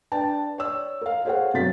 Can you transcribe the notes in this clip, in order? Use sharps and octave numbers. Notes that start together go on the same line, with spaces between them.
D4 B4 G5 A5
C#5 D5 E6
A#4 F5
G#4 A4 C5 C#5 F5 F#5
G1 C3 F#3 A6 B6